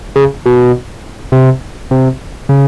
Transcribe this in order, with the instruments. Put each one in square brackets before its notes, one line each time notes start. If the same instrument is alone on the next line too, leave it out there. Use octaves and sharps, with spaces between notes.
[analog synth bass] C#3
B2
C3
C3
C#3